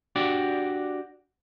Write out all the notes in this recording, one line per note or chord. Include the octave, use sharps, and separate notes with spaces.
D4 F#4 G4 D5